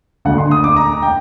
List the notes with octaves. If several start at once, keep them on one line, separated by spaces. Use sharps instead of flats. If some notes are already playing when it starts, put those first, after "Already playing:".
D2 D3 A3 F#5
C6
D#6
D6
A#5
G5